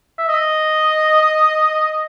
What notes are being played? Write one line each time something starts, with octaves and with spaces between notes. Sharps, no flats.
E5
D#5